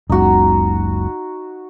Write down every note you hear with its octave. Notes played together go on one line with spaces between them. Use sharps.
F#1 C#2 D#4 F#4